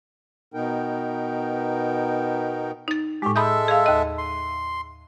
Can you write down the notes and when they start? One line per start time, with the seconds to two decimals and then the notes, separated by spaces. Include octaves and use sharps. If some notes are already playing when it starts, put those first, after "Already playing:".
0.54 B2 B3 D#4 A#4 G5
2.88 D#4 A6
3.22 A2 G#3 G4
3.36 G#3 A4 E5 B5 D#6 G6
3.68 G#4 F5
3.86 D#2 D#5
4.18 C6